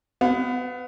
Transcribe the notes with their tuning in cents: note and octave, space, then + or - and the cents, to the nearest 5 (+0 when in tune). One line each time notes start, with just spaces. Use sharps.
B3 +25 F#5 -40